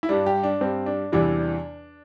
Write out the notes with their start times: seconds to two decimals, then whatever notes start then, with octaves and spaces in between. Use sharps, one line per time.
0.03 E4
0.09 G2 G3 D4
0.26 G4
0.43 D4
0.61 G2 G3 C4
0.86 D4
1.12 E2 C3 E3 G3 D4